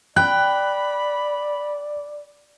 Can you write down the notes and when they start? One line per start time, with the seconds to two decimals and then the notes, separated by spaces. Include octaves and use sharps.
0.16 D5 G5 B5 F#6